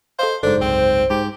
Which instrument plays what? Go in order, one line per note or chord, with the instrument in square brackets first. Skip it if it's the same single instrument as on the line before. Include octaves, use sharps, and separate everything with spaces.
[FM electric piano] A4 D#5 F5 [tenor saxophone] C5
[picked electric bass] F#1 G#2 [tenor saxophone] D4 [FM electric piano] A4 [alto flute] C5
[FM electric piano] C2 [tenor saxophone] C4
[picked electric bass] G#2 [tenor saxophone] G4